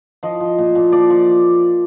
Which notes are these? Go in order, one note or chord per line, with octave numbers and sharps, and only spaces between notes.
F3 D#5
F3
A#2
A#2
F3 D5
F3